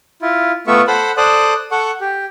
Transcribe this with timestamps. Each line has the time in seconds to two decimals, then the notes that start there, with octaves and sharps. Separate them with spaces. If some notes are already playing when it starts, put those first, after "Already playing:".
0.22 E4 F4
0.67 A3 B3 F4 E5 C#6
0.87 A4 C5 F#5 B5
1.17 A4 C5 D5 D#6 F#6
1.71 A4 F#5 C#6
2.01 G4